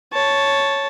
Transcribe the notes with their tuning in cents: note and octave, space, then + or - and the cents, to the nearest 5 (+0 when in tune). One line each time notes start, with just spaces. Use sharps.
C#5 +0 A5 -5